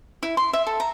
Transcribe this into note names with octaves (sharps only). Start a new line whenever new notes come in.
E4
C6
E5
A4
A#5